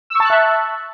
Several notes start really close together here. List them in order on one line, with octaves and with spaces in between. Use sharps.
E6 C#6 A5 F#6 E5